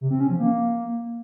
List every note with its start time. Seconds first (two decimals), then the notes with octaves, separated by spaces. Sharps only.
0.01 C3
0.11 C4
0.20 C#4
0.30 F3
0.40 A#3